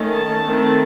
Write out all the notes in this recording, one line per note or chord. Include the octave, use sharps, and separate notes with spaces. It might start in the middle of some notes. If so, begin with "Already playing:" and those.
Already playing: D#3 A3 C#4
A5
D#3 A3 C4